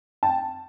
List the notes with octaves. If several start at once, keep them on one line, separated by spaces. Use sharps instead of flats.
G5 A5